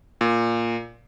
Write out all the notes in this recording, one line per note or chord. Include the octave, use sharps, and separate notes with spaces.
A#2